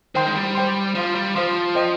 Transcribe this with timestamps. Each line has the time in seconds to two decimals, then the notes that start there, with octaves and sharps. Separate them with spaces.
0.15 D#3 C5 G5 C6
0.27 G#3
0.35 G3
0.55 C5 G5 C6
0.95 F3 C5 F5 C6
1.15 G3
1.35 F3 C5 F5 C6
1.75 C5 D#5 G5